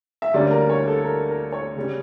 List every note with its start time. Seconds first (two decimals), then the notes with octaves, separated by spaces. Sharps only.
0.22 E5
0.34 D2 D3 G3 A#3 C#4 D5
0.51 A#4
0.70 C#5
0.88 A4
1.04 A#4
1.29 A#4
1.53 C#5
1.76 C#3 G3 C#4